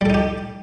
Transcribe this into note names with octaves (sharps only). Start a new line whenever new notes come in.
G3 D#4 G4 A4